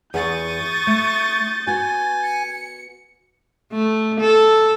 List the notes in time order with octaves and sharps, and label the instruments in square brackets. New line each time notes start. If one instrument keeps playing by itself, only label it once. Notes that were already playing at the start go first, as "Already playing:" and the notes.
[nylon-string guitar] E2 G#4 F#5 [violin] C#6 D#6 [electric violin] G6 A6
[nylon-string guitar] A3
[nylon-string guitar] B3 F#4 [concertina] G#5
[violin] C#7
[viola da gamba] A3
A4